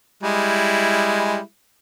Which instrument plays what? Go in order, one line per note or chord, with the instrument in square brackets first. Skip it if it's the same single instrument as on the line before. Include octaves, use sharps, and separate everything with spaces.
[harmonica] G3 G#3 E4